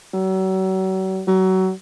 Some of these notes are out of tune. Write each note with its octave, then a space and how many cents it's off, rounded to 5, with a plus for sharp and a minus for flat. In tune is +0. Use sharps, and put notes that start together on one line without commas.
F#3 +40
F#3 +25